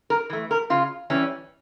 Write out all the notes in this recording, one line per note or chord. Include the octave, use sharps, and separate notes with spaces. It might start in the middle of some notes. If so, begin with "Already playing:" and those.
A#4
E3 A3
A#4
C#3 F4
E3 G3 C#4